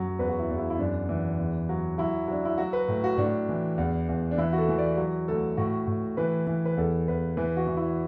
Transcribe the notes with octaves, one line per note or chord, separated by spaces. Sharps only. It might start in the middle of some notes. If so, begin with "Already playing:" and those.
Already playing: F#2 F#3
E2 B4
F#4
E4
E2
E4
E4
F#2 D4
E3
E2
F#3
F#3 E4
F#3 D4
E4
F#3 F#4
B4
A2
F#4
A2 D4
E3
E2
E2
D4
E3 E4
F#4
A4
E3
D5
F#3
D2 A4
A2 F#4
A2
E3 B4
E3
B4
E2 A4
E2 B4
E3 B4
F#4
E3
E4